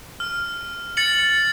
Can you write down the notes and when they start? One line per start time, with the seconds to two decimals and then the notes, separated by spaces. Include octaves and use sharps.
0.20 F6
0.97 A6 C#7 F#7